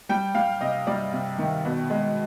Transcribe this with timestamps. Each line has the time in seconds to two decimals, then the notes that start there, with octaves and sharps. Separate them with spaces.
0.09 G3 G5
0.34 G3 F5
0.61 C3 D#5
0.87 G3 D5
1.12 C3
1.38 D#3
1.65 B2
1.90 G#3